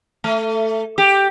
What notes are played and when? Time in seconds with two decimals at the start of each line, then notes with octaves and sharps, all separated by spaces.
0.24 A3
0.98 G4